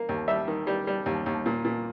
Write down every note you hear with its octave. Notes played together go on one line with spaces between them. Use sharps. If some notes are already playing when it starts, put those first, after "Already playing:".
Already playing: A#3
D#2
G3 E5
D#3
G3
G3
D#2
D#2
A#2
A#2